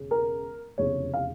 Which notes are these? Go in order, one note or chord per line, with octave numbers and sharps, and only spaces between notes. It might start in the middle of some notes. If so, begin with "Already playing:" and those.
Already playing: E1 C#3
A#4
F1 E2 C#3 C#5
F5